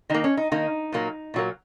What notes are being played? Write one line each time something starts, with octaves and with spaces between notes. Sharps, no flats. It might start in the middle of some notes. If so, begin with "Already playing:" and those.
D#3 A#3 D#4
C#4
D#4
D#3 A#3 D#4
A#2 F#3 A#3
A#2 F#3 A#3